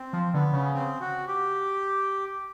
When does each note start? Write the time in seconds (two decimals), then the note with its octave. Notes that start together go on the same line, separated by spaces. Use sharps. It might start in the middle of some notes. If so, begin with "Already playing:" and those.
Already playing: C4
0.13 F3
0.34 D3 B3
0.53 C#3
0.74 C4
1.01 F#4
1.28 G4